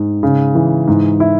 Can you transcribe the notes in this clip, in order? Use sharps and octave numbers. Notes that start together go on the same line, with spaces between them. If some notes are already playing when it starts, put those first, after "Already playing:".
Already playing: G#2
C#3
E3
G#2
E4